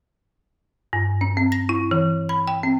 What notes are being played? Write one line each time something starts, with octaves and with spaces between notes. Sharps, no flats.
G2
C#4
C4
A#6
E4
E3
B5
G5
C4